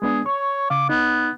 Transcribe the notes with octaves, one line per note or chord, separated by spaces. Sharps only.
G#3 B3 D4 G#4
C#5 C#6
C#3 F5 D6
B3 D#4